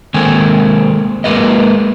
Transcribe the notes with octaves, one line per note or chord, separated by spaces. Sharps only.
D#3 G#3 A#3 C4 A4 G#5
G#3 A#3 A#4 B4 D#5